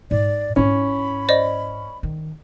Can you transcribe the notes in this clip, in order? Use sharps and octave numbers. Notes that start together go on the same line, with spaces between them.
G#2 D5
G#2 C#4 E4 B5
C5 D5 D#5
D#3